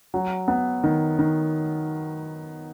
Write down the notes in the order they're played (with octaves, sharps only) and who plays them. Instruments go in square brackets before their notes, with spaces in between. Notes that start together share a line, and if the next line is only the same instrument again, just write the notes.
[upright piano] F#3
B3
D#3
D#3